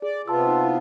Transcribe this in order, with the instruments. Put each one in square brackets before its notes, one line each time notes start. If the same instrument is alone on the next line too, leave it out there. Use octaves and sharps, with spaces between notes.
[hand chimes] G#4 [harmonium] D5
[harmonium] C3 B3 F4 [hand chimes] A5 C6 E6
[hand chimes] D#4
E4